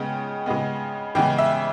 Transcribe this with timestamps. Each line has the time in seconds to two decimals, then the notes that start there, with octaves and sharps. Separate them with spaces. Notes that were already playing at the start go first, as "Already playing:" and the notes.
Already playing: C#3 G#3 B3 G5
0.46 C#3 G#3 B3
1.15 C#3 E3 G#3 B3 G5
1.38 E5